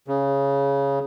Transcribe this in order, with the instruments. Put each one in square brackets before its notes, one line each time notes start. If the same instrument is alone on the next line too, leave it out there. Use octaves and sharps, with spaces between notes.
[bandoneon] C#3